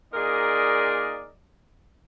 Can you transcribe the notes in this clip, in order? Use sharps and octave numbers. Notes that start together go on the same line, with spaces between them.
A#2 D#4 G#4 A#4 D5 D#5